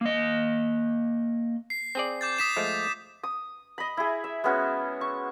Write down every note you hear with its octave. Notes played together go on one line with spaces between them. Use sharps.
A#3 D#5
C7
C4 G#4 D5
D6 G6 A6
D#6 B6 E7
F3 G#3 A3
D#6
D#5 B5
E4 G#4
E5
G#3 B3 C#4 F#4
C#6